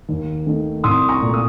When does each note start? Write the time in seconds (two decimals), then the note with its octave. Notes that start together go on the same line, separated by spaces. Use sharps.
0.09 D#2
0.46 D#3 A3
0.84 C2 C6 D#6
1.09 A#5 C#6
1.21 A#2 A3
1.34 D#6